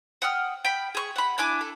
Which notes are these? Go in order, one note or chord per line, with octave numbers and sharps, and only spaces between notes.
F#5 G5 D#6 F6
G5 B5
G#4 C#6
F#5 B5
D4 E4 G#5 D6
A4